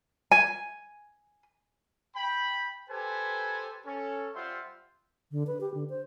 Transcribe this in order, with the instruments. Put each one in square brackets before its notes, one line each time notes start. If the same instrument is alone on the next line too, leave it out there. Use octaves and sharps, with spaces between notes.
[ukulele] G#5
[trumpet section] G5 B5
G4 A4 B4 C5 G#5
C#4 A4
G3 F4 C5 E5 F#5 C6
[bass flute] D3
B4
G4
D3
C5